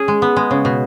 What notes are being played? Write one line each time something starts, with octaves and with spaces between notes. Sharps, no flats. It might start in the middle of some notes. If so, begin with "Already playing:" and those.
Already playing: C#4 G#4
G#3
B3
G#3
C#3
B2